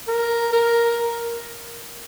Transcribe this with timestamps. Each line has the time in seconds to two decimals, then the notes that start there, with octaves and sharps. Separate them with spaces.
0.08 A#4
0.53 A#4